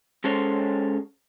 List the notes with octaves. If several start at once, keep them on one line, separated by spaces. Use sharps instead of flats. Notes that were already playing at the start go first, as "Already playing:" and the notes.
G#3 C#4 A4 C5 C#5